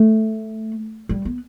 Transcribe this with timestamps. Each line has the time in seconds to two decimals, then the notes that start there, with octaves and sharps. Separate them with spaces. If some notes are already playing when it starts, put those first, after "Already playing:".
Already playing: A3
1.09 G3
1.25 B3